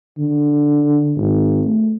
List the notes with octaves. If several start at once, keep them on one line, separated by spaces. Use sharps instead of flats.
D3
G#1
A3